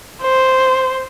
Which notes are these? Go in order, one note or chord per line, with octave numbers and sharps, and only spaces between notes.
C5